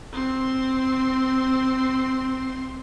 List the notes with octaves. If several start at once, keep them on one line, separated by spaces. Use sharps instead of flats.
C4 C6